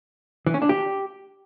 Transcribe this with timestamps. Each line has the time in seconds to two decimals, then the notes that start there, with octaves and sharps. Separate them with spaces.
0.47 E3
0.54 C#4
0.62 D4
0.69 G4